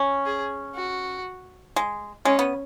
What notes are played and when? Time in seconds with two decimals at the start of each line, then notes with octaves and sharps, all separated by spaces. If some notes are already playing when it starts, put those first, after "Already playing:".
Already playing: C#4
0.26 G#4
0.75 F#4
1.76 G#3
2.25 G#3 C#4
2.39 B3